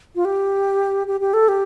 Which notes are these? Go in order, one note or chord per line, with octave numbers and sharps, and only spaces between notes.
F4
G4
G4
G4
A4
G4